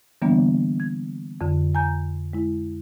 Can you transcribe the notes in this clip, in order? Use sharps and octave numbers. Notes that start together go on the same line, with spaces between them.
D3 E3 G3 A#3 B3 D4
G#6
F2 D3
G#5 A#5 G6
G#3 E4